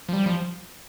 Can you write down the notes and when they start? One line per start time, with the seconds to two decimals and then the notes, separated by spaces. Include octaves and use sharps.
0.09 F3
0.13 G3
0.26 F3